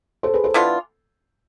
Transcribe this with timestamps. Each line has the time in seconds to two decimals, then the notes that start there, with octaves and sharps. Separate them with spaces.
0.23 A4 C5
0.34 G#4 B4
0.44 A4 C5
0.54 E3 B3 D4 F4